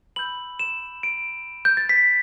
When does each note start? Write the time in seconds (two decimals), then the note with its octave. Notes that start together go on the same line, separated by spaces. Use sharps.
0.16 B5 E6 G6 F#7
0.59 E7
1.03 D7
1.65 G6
1.77 A6
1.89 B6